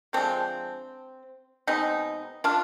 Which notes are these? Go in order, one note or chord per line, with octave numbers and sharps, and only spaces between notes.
D3 F3 G#3 C4
B2 G#3 B3 C4 D#4
D4 F4